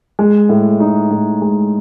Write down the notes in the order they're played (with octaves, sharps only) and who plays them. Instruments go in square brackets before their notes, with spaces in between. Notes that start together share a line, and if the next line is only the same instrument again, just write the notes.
[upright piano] G#3
A2
D#4
A2
G#3